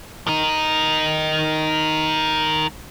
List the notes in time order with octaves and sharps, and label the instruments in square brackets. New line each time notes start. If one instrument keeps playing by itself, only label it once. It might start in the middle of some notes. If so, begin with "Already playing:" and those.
[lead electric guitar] D#3 D#4